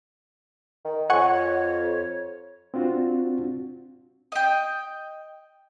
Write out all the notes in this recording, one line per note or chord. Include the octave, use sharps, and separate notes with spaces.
D#3
F2 C#5 F#5 G#5 C#6
C4 D4 F4 F#4
D#5 G5